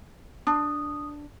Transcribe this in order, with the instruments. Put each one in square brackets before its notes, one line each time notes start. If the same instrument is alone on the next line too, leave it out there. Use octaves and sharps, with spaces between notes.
[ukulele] D4 [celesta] D#6